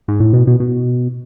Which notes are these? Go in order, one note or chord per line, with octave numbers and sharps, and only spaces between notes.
G#2
A2
B2
B2
B2